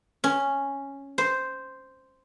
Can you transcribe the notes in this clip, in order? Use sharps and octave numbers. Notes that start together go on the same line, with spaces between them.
C#4
C5